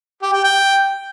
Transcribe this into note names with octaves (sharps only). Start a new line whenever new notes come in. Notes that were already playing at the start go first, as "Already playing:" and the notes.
G4
G5
G5